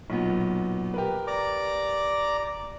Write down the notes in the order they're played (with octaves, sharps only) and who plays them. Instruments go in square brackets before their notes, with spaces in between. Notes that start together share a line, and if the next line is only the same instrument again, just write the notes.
[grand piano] B1 A#2 B3
G4 A#4 B4
[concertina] D5 A#5 D6